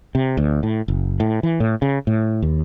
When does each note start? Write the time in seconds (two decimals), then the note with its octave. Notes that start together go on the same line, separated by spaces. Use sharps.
0.15 C3
0.37 D2
0.63 A2
0.88 F#1
1.20 A2
1.43 E3
1.60 A2
1.82 C#3
2.07 A2
2.42 D#2